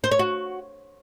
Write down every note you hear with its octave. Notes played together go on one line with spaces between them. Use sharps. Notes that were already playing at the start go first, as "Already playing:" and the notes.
C5
C#5
F#4